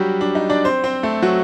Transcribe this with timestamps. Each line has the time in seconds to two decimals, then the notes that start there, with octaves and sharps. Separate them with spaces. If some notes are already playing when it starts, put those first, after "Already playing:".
Already playing: F#3 G3 D4 F#4 G4
0.21 D4
0.35 D#4
0.50 D4 D5
0.64 C4 C5
0.84 C4 C5
1.03 A3 A4
1.22 F#3 F#4